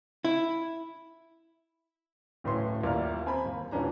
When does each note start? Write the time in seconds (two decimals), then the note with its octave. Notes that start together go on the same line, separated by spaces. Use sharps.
0.25 E4
2.44 D1 A2 E3 C#4 C6
2.83 D#1 D#2 E4 D5 A#5 F6
3.26 C4 G#5 A#5 B5
3.46 D#2
3.71 D#1 E3 C#4 D4 A#5